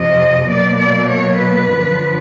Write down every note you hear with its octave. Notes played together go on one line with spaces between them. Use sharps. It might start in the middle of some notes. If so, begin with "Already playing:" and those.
Already playing: F2 C3 F3 D#5
B2 F#3 A#3 D5
D5
C#5
B4
F#2 D3 F3